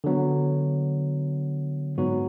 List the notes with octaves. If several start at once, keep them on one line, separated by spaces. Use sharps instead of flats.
D3 F#3 B3
G#2 F#3 B3 F#4